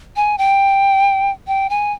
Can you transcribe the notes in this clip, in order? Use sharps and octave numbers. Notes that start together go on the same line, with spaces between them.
G#5
G5
G5
G#5